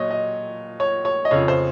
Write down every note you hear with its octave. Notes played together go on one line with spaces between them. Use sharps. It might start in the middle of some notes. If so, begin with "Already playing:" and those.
Already playing: A#2 F#3 C#5 D#5
D#5
C#5
C#5
D#5
F2 C#3 F3 C#5
C5